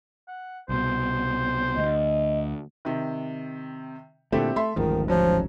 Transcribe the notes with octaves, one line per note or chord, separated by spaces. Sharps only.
F#5
C2 B2 C5
D2 D#5
C3 D#3
A#2 D3 A3 C4 E4 G4
A3 E5 C6
D1 A1 G#2 D#3 F3
F3 F#3 C#4